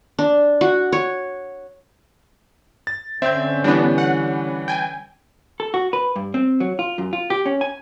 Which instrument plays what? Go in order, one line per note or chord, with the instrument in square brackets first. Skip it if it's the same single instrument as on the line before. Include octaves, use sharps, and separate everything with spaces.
[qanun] D4
F#4
C#5
[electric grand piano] A6
[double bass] D3 C#4 [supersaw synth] C4 [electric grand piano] E5 G6
[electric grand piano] E3 G3 [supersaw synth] B3 D4
[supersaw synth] F#5
G5 G#5
[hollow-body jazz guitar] A4
F#4
B4
G2
C4
F#3
F4
F#2
F4
G4
C#4
G#5